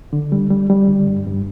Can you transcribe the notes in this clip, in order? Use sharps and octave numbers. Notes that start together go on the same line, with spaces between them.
D3
G3
G3
G3
D3
G2
G2